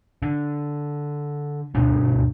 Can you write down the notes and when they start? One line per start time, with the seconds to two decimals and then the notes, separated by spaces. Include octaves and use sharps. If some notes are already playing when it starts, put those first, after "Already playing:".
0.22 D3
1.75 D2 G2 B2 D4